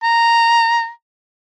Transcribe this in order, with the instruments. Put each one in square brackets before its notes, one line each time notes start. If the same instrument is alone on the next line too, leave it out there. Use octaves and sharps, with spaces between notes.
[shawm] A#5